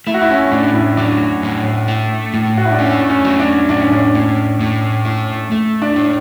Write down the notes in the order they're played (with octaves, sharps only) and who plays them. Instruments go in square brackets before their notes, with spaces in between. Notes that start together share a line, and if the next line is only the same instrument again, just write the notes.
[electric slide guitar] A3 [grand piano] E4
[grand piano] F#4
E4
C#4
[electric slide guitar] A2 [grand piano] D4
[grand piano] D4
E4
[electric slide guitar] F#3 [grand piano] D4
[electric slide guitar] A2
A3
A2
[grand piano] F#4
E4
D4
[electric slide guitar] A3 [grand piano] C#4
[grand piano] C#4
[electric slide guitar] F#3
[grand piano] D4
[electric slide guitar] A2 [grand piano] D4
[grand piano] C#4
D4
[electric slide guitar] A2
A2
A3
A3
[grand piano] D4
[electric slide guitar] A2